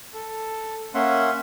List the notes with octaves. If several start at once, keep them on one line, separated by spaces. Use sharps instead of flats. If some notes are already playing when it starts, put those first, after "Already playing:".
A4
A#3 C#4 E5 F#5 C6